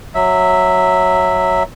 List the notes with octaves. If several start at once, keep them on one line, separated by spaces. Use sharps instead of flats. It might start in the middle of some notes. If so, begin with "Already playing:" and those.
F#3 E5